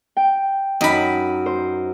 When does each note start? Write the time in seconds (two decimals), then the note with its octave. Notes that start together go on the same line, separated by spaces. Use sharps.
0.17 G5
0.81 F#2 D#4 B5
1.46 C5